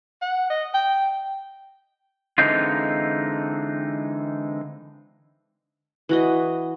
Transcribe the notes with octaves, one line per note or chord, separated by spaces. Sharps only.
F#5
D#5
G5
D3 E3 G#3 C4 D#4 F4
E3 F#4 D#5